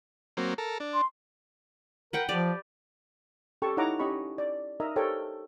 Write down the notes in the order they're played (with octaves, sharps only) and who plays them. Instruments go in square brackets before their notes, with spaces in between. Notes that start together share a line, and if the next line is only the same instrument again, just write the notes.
[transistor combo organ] F#3 A#3 C4
A4 A#4
D4
[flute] C6
[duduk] A#4 [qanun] B4 F#5 G5
[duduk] F3 [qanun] G4 B4 D5
[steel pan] C#4 G4 A4 G5 A5 C#6
D#4 E4 C#5 F#5 A#5 D6
C#4 G4 D#5 B5 C#6
D5
D#4 A#4 D#5 E5 A#5 D#6
G4 A4 A#4 C5 C#5 G5